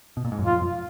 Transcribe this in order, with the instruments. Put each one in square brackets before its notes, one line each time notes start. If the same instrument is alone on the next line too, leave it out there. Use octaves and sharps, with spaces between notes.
[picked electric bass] B2
A#2
G#2
F#2
[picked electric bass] F2 [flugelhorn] F4